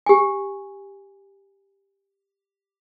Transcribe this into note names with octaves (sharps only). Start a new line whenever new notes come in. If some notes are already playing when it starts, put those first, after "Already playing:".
G4 G#5